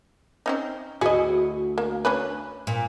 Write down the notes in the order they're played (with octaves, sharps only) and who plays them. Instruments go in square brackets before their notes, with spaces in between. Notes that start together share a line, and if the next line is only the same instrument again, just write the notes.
[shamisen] C4 C#4 D#4
[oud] D2 E4 F#4 [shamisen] G#4 D#5
[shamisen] A#3
C#4 D4 B4
[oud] A#2